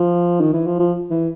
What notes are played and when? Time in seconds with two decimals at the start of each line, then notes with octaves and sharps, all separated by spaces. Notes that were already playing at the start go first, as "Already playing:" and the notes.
Already playing: F3
0.41 D#3
0.53 E3
0.67 F3
0.79 F3
1.10 E3